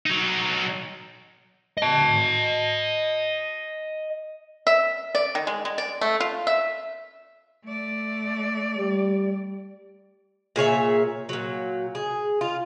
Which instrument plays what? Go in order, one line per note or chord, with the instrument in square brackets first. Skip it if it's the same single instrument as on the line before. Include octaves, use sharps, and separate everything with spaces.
[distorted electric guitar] F#3 D#4
[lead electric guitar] D#5 A5
[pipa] E5
D5
D#3
G#3
G#3
D5
A3
F4
E5
[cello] A3 D5
[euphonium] G3
[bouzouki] A#2 G#4 C#5 E5
A#2 F#3
G#4
F4